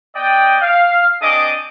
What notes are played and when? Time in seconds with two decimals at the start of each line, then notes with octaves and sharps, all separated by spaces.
0.16 B3 D5 D#5 G5
0.61 F5
1.22 C4 D4 G#4 D#5 D6 D#6